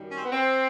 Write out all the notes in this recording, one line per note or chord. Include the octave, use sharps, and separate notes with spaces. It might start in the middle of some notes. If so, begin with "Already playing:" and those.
Already playing: F#2 D#3 G3
C#4
C4
B3
C4